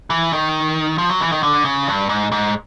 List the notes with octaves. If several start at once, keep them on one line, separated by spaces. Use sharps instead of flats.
E3
D#3
F3
F#3
E3
D#3
D3
C#3
G2
G#2
G#2